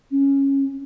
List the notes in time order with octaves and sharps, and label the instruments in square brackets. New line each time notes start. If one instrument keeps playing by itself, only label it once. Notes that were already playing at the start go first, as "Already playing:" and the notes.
[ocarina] C#4